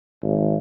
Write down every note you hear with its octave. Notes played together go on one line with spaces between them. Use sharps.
G#1